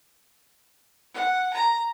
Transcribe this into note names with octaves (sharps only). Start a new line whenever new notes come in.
F#5
A#5